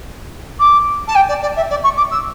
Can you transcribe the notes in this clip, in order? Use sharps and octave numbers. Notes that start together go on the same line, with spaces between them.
D6
A5
G5
D5
D5
E5
D5
C#6
D6
E6